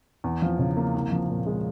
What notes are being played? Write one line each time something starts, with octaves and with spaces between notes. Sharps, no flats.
E2
F3
C#3
A#3
C2
F3
A#2
G#3